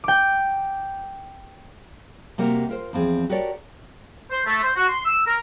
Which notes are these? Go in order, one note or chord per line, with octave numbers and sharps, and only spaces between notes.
G5 D6
C3 A#3 F#4 G4 A#4
F4 A#4 C5
E2 F3 C4 G#4
F#4 G4 A4 A#4 C#5 D5
C5
A3
C5
F#4
C6
E6
A#4